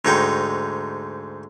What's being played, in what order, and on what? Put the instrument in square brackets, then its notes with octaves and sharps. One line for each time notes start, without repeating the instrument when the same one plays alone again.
[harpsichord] D2 G#2 D#4 C#5 G5